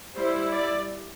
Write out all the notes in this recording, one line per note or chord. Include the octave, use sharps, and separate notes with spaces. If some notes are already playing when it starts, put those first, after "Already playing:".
G3 E4 C5
D5